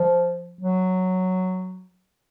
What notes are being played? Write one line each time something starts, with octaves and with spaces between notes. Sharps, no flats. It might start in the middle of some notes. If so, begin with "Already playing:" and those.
Already playing: F3
F#3